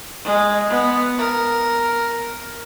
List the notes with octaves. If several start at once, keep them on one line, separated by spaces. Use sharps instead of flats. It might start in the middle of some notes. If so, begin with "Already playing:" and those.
G#3
B3
A#4